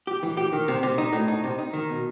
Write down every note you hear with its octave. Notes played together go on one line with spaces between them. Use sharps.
G4
E3
G4
D#3
C3
C3
D#4
A2
D#4
C3
D#4
D#3
B2